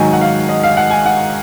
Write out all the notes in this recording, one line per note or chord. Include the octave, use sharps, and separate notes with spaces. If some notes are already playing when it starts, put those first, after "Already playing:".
Already playing: G#2 D#3 F#3 G#5
F#5
F5
D#5
F5
F#5
G#5
F#5